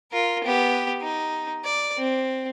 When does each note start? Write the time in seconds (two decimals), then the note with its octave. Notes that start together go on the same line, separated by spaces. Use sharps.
0.12 F4 A#4
0.44 B3 G4
1.01 D#4
1.64 D5
1.97 C4